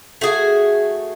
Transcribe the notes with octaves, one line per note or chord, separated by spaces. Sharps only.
A3 F#4 G#4